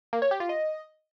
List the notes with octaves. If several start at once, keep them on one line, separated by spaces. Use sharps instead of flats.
A#3
C#5
G4
F4
D#5